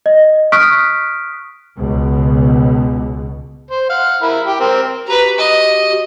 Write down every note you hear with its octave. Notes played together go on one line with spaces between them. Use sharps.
D#5
C#6 D#6 F6 F#6 B6 D7
C#2 B2
C5
F5 F#5
E4 A#4 B5
G4
C4 A#4
F#4 G4 B4 A#5
D#5